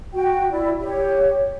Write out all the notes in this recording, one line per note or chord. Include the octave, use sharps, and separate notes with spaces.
F#4 G5
E4 D5
G4 C#5